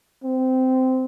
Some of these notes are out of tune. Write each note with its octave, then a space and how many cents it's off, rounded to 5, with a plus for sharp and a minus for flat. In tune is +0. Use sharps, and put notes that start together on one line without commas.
C4 -15